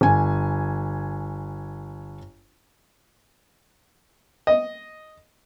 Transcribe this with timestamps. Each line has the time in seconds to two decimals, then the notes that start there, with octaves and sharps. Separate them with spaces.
0.01 G1 G#5
4.47 D#5